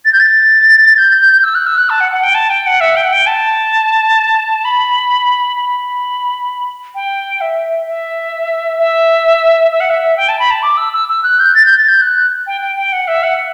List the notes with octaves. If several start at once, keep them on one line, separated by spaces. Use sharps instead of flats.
A6
G6
A6
G6
E6
F#6
E6
F#6
A5
F#5
F#5
G5
A5
G5
F#5
E5
G5
F#5
G5
A5
B5
B5
G5
E5
E5
E5
E5
F#5
E5
G5
A5
B5
A5
D6
E6
E6
E6
F#6
G6
A6
G6
A6
G6
F#6
G5
G5
G5
F#5
E5
F#5